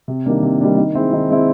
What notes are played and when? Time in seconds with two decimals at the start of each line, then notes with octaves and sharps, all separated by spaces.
0.08 C3
0.26 D#3 G3 A#3 D4
0.43 C3
0.60 D#3 G3 A#3 D4
0.77 D#3
0.95 G#3 C4 E4
1.13 D#3
1.30 G#3 C4 E4